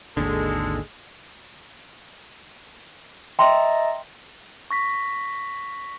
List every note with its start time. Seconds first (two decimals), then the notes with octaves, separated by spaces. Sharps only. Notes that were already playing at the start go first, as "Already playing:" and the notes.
0.17 G#1 D#2 D3 G#3 A4
3.39 D#5 E5 G5 A#5 C6
4.71 C#6 A#6 B6